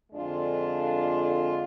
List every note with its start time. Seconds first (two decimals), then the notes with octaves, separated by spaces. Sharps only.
0.11 F2 D3 G#3 D4 F4